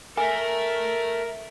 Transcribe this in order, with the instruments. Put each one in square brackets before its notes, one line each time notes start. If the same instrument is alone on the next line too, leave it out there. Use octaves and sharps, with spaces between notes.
[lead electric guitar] A4 E5 [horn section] A#4 [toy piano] G#5